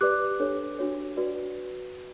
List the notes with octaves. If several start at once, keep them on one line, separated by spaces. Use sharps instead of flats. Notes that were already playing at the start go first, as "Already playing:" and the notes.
G4 B4 D5 D6 F#6
D4 A4 C#5
D4 F#4 C#5
F#4 B4 D5